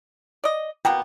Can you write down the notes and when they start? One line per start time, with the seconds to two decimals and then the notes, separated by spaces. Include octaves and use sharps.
0.44 D5 D#5
0.85 B2 A#3 B3 G5